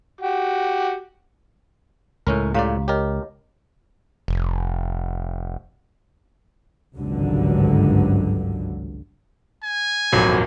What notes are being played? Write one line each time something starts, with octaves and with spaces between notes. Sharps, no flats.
F#4 G4
C#2 A2 C#4 A#4
A2 C#3 G4 D5 F5 A#5
G4 A#4 C#5 D#5
F1
G#1 C#2 G2 D3 F#3
G#5
D#1 G#1 F2 F#3